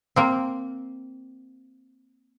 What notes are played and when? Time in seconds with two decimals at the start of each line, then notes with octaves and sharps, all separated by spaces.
0.16 A#3 C4